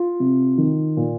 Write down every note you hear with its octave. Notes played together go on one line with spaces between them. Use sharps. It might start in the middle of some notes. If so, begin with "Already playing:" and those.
Already playing: F4
C3
D#3
A#2